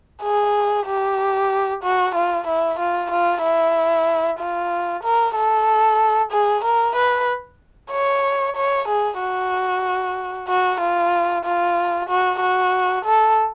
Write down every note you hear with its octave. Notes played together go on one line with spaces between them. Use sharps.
G#4
G4
F#4
F4
E4
F4
F4
E4
F4
A#4
A4
G#4
A#4
B4
C#5
C#5
G#4
F#4
F#4
F4
F4
F#4
F#4
A4